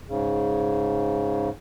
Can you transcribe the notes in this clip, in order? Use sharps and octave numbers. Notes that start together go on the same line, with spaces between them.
G#2 C#3